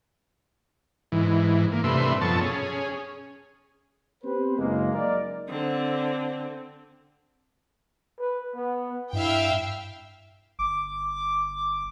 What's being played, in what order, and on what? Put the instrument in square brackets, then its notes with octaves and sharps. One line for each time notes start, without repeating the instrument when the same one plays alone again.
[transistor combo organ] G#2 E3
A#3
G2 C3 A3 B4 E5 C6
F#2 B2 F3 A4 A5 C#6
C#4 G#4
[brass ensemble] B3 C4 G4 B4 C5
F#1 G#3 A#3
F#3 A#3 D#4 A#4 D5
[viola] D3 C4
[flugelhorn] B4
B3
[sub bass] G2 [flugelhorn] E4 [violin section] E5 F5 G5
[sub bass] G1 [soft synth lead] D6